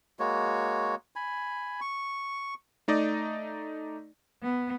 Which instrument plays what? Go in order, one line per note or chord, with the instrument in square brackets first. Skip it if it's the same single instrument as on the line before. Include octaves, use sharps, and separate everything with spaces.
[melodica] G#3 A#3 F#4 C#5
G#5 B5
C#6
[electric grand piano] A3 D#4 D5 D#5
[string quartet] B3